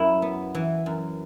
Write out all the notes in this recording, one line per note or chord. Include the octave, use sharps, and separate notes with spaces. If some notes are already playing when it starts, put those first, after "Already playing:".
Already playing: F#2 E4
B3
E3
F#2